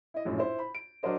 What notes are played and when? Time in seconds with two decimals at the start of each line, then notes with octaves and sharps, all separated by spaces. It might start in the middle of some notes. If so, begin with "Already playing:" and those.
0.14 E4 D#5
0.25 A#1 F#2 A2
0.38 E4 C5
0.59 B5
0.75 D7
1.03 F#3 D4 A#4 C5 D#5